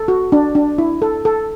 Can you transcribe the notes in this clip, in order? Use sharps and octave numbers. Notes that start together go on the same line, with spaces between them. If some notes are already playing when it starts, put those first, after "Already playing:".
Already playing: A4
F#4
D4
D4
E4
A4
A4